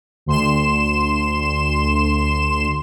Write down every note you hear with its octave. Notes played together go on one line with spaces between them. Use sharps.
D2 C6 E7